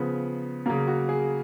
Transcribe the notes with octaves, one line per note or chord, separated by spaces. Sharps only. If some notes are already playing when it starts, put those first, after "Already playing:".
Already playing: C#3 F3 B3
C#3 F#3 A#3 A#4
F#4
G#4